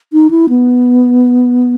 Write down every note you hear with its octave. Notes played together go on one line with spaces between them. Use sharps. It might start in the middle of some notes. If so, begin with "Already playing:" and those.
D#4
E4
B3